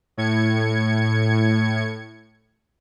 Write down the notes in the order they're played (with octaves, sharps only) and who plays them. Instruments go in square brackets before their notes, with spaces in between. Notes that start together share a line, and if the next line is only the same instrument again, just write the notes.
[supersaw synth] A2 G#6 C#7